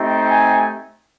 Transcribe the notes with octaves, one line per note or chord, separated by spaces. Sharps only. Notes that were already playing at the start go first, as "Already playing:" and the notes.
Already playing: A3 C4 D#4 G4
G#5